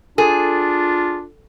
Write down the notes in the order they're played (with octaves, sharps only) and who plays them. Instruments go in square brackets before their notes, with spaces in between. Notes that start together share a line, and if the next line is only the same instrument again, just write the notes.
[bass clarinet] D4 [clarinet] F4 [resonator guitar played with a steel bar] G#4 [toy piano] A4